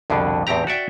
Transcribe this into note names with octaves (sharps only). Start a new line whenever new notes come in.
C2 F2 B2 D3
E2 A2 C4 G4 A#5
F#4 D5 E5 G5